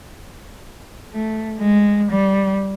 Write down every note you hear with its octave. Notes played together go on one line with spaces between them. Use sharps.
A3
G#3
G3